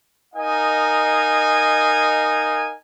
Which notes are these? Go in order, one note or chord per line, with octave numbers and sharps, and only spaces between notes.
D#4 A#4 D#5 F5 G#5